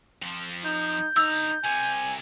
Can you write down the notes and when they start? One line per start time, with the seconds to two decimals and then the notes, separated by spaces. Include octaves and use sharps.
0.22 F2 F3
0.64 D#4 G6
1.17 D3 D#4 A#5 E6
1.64 C2 C3 G#5